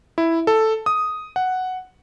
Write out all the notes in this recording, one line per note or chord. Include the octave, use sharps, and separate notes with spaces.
E4
A4
D#6
F#5